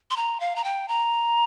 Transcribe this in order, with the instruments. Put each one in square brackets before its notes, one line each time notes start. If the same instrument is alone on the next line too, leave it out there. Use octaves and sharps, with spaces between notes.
[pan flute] C6
A#5
F5
A#5
G5
A#5